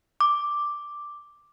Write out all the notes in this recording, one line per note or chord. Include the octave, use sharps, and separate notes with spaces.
D6